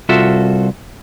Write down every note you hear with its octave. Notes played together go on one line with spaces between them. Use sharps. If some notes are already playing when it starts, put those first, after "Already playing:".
C2 F4 F#4 A4 E5